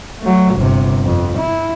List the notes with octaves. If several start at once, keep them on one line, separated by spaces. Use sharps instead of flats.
F#3 A3
G1 C3
F2
E4